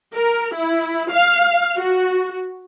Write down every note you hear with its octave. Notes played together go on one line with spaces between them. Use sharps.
A#4
E4
F5
F#4